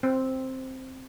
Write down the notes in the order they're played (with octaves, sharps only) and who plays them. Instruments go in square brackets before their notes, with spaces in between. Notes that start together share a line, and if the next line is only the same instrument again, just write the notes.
[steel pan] C4